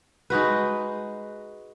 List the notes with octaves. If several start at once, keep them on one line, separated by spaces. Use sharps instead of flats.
G#3 D#4 F#4 B4